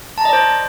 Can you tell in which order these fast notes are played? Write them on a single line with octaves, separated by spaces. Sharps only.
A5 A#5 D#5 D5 C5